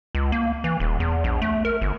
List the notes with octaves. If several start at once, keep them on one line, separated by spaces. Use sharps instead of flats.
C#2
A#3
E3
D#1
E2
A#1
A3
A#4
G1